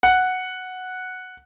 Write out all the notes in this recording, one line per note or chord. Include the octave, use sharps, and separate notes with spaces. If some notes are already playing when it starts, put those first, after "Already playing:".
F#5